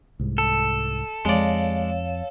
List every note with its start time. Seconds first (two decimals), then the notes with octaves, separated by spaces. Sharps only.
0.20 C2 G#2
0.38 A4
1.25 F2 G#3 C#5 D5 F5